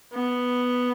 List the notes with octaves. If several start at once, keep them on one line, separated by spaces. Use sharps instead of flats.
B3